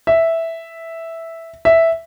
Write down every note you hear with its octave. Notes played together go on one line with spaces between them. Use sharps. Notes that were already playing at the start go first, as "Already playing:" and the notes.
E5
E5